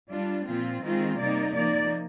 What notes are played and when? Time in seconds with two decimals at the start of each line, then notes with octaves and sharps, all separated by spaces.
0.11 G3 D4 F4
0.47 A#2 F3 C4 F4
0.82 D#3 G#3 C4 F4
1.18 C3 G3 A#3 D#4 D5
1.54 F3 A#3 D#4 D5